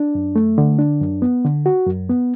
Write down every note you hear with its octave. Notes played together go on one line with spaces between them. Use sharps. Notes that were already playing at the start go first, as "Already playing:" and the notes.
Already playing: D4
F#2
A3
D3
D4
F#2
B3
D3
F#4
F#2
B3